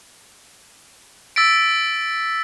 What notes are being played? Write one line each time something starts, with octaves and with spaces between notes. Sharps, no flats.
E6 A6 B6 D7